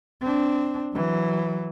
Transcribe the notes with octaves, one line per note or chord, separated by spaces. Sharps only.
C4 D4
E3 F#3